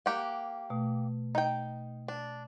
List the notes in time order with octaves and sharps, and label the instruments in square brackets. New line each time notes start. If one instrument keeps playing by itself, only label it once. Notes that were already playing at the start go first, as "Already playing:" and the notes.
[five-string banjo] A#3 G4 F#5
[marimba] B2 A3
[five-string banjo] D#4 G5
D4